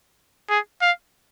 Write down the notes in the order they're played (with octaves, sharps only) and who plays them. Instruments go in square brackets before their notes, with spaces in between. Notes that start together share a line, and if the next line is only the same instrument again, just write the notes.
[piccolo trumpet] G#4
F5